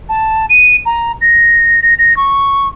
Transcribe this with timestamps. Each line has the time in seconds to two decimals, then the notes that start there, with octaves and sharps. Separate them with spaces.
0.09 A5
0.50 D#7
0.86 A#5
1.21 A#6
1.83 A#6
1.99 A#6
2.17 C#6